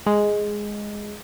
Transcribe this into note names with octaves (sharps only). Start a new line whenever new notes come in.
G#3